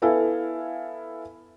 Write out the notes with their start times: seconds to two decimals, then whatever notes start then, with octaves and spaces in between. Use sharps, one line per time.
0.02 B3 E4 A4 E5 F5 G#5